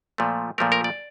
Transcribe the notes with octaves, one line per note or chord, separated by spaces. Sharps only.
A#2 F3 A3
A#2 F3 A3 A#4
A#4
D5